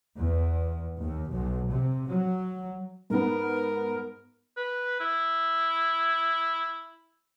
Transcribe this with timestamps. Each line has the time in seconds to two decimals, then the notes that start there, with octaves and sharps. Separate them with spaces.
0.17 E2
0.98 D#2
1.30 B1
1.68 C3
2.07 F#3
3.10 G#2 B3 A#4
4.57 B4
5.00 E4